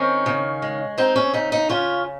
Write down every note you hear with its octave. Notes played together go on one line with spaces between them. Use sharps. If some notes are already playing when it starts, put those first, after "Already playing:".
Already playing: D#3 C4 C#4
C#3
G#3
C4 D#4
C#4
C#3 D#4
D#4
C#3 C#4 F4